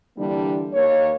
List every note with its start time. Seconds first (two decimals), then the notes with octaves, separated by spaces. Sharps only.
0.17 D3 E3 G3 A#3 D4
0.73 D#2 A#3 C#5